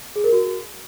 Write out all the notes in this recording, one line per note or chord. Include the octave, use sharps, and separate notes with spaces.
G#4
A#4
F#4